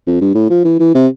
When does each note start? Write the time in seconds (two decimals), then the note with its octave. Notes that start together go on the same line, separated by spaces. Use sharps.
0.07 F2
0.21 G2
0.35 A2
0.50 F3
0.65 E3
0.80 E3
0.95 C3